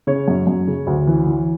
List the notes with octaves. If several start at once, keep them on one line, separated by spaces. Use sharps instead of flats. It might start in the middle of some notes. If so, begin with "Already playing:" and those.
C#3 C#5
F#2
F#2
C#3
D2
E3
E3